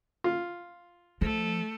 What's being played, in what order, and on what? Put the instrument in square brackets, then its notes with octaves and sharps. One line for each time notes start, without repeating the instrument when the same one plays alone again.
[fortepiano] F4
[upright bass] F3 [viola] A3